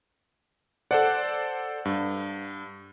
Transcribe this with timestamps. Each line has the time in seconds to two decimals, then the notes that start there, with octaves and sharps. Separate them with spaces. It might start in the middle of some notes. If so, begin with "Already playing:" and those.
0.91 A4 C5 D5 F#5
1.85 G2